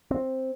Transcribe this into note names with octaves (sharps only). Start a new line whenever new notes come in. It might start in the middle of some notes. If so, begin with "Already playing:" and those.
C4